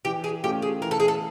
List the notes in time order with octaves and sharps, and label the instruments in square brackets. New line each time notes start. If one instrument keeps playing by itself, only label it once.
[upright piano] E3 [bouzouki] G4
[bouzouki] G#4
[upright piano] A3 C#4 F4 [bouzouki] G4
[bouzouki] G#4
[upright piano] E3 [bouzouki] A#4
[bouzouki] A4
G#4
A4